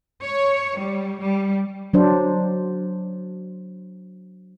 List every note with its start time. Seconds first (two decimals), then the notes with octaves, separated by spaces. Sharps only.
0.24 C#5
0.79 G3
1.21 G3
1.93 F#3 D4 C5